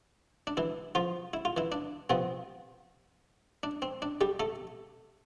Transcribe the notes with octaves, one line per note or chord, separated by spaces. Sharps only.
D4
E3 E4
F3 F4
E4
F4
E3 E4
D4
C3 F3 B3 C4
D4
C4
D4
G3 G4
A3 A4